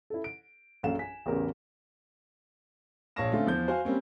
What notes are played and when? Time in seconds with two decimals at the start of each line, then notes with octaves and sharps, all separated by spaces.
0.10 E4 A4
0.24 D7
0.83 A#1 F#2 A4 F5 E7
0.99 G#5 B6
1.26 A1 E2 C#3 G#4 A#4
3.16 A#1 C#5 F5 A5 A#6 E7
3.32 D3 A3 C4 C#4 F4
3.46 E2 F3 G6
3.68 F#4 C5 F5 G#5
3.85 G3 A#3 C4 C#4